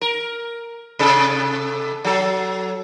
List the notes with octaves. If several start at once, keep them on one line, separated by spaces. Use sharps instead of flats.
A#4
C3 A4
F#3 A4